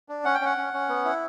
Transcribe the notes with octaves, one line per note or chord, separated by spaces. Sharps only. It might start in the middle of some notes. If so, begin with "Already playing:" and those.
D4
C#4 F#5
G5
C#4 F#5
C#4
C#4
B3
E4